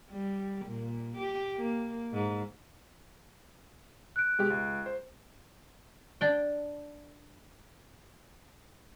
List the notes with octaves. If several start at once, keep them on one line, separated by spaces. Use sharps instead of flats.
G3
A#2
G4
A#3
G#2
F#6 D7
B2 G#3 G4
C#2
C5
D4 G5